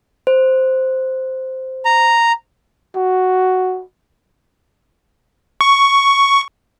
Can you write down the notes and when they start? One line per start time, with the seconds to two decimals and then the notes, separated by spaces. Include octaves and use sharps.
0.27 C5
1.85 A#5
2.96 F#4
5.61 C#6